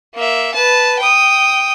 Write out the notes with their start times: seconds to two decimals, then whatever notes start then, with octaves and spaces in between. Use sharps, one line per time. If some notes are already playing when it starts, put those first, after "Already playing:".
0.15 A#3 E5
0.54 B4 A5
0.99 G5 D#6